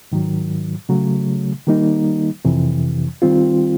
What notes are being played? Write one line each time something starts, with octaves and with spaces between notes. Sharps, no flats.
G#2 D#3 F#3
C#3 F#3 A3
D#3 G3 A#3 D#4
F2 C3 E3
D#3 G3 C4 F4